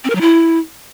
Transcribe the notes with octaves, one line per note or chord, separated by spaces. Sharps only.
C4
A#4
F#3
E4